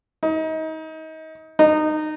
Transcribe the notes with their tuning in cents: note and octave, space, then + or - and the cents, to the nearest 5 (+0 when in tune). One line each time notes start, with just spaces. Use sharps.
D#4 +30
D#4 -20